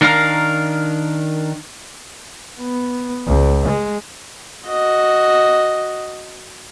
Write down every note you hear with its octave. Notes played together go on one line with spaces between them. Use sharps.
D#3 D4 A#4 F5 A#5
B3
C#2
G#3
F#4 D#5